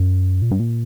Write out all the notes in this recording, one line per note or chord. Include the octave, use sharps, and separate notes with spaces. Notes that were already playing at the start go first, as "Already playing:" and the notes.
Already playing: F#2
A#2
G2
A#2